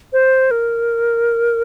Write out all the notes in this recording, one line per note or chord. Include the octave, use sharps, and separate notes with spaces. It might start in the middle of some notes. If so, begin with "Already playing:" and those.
C5
A#4